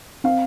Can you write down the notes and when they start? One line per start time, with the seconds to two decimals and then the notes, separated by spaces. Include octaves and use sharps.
0.24 C4 F5